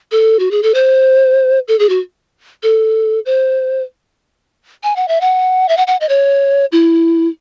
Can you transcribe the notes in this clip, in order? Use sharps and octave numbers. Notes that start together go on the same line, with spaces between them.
A4
F#4
G#4
A4
C5
A4
G#4
F#4
A4
C5
G#5
F#5
E5
F#5
E5
F#5
F#5
D#5
C#5
E4